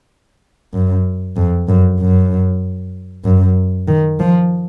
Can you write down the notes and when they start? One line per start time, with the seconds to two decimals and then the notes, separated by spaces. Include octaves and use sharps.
0.74 F#2
1.36 F2
1.68 F#2
2.00 F#2
3.25 F#2
3.88 D#3
4.20 F3